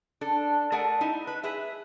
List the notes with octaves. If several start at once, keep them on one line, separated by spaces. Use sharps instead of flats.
D4 A4
A3 G#4 A#4 D5 F#5 A5
D#4 E4
B4
G#4 B4 E5